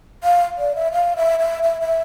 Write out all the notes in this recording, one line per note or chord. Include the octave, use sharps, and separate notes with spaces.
F5
D5
E5
F5
E5
E5
E5
E5